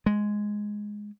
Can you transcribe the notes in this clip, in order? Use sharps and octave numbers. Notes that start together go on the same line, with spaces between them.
G#3